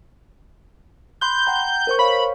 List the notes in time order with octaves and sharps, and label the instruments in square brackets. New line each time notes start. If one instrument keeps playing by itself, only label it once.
[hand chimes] B5 C6 F#6 [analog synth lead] G6
[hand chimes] F#5 G5 A#5
A#4 C5 C#6
[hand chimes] C#5 F5 [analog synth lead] B5